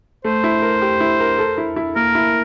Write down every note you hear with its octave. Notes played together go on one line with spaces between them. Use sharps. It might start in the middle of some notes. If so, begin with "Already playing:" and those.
A3 C5
E4
A#4
G4
E4
A#4
A4
E4
E4
A#3 A#4
E4